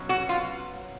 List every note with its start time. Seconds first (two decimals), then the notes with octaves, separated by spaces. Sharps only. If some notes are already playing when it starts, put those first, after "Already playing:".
Already playing: B2 F#3 C#4
0.09 F#4
0.29 F4